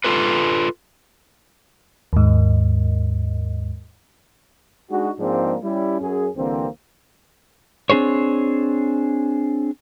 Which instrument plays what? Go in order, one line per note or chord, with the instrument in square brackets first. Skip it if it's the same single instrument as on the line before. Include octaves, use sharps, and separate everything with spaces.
[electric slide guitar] F4 A4 B4
[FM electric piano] D#2 G#2
[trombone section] G#3 D4 D#4 F#4
G#2 F3 G#3 A#3 C4 D4
G3 C#4 E4
F#2 G#4
C2 D3 E3 A#3 C4
[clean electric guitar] C4 D4 G#4 C5 C#5